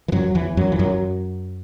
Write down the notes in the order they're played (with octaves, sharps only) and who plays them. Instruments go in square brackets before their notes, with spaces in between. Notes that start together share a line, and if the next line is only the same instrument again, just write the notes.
[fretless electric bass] E3
F#2 F#3
E2 E3
F#2 F#3
E3
F#2 F#3